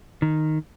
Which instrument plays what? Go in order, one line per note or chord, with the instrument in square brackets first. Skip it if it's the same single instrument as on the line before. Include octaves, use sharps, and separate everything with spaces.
[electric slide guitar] D#3